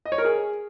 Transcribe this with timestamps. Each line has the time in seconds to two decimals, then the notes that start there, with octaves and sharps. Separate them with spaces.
0.05 D#5
0.12 C#5
0.18 A#4
0.25 G#4